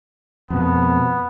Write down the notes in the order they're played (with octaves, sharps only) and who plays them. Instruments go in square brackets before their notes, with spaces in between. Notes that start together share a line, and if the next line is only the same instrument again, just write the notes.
[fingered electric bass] F2 B2 [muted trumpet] B3